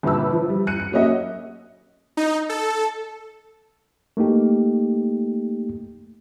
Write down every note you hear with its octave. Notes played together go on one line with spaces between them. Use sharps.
G1 A#2 B4 A5 E6
F3
G3
F#6 C#7 D#7
C#7
F#3 A#3 C#4 D#5 E5
D#4
A4
A3 A#3 D#4 G4